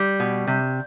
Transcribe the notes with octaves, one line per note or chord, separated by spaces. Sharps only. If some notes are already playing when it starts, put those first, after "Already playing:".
Already playing: G3
B2
C3